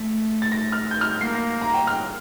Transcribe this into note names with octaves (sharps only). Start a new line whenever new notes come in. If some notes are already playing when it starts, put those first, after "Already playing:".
Already playing: A3
A6
A#6
F6
G6
F6
G6
A#3 C7
A#6
A#5
G5
F6